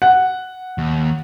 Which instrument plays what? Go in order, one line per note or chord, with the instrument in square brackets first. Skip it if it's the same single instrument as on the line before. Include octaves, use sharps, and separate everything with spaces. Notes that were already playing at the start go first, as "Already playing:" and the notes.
[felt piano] F#5
[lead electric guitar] D#2